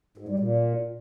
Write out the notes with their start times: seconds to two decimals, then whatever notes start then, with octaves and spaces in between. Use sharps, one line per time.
0.18 G#2
0.28 G3
0.39 A#2